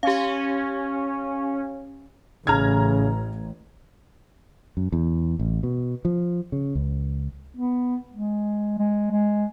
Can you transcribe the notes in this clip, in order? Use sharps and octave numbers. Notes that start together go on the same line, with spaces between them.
C#4 G4 F5
A1 C#3 A#5 F6 G#6
F#2
E2
A1
B2
F3
C#3
C#2
B3
G#3
G#3
G#3